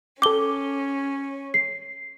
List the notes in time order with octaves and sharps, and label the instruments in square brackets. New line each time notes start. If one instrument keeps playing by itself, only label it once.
[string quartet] C#4 [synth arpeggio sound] A4 G5 [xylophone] D6 G7
[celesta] C7